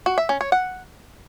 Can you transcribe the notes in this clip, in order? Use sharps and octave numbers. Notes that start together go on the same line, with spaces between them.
F#4
E5
C#4
C#5
F#5